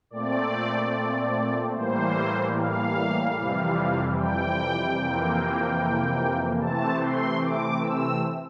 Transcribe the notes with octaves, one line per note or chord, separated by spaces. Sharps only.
A#2 A3 C4 D5
A2 E3 G3 A#3 C5
F5
F2 C3 E3 G3
G5
F2 C3 E3 A#3
C3 E3 A3 C4 A5
C6
D6
E6